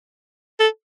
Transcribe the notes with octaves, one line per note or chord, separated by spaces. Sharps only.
A4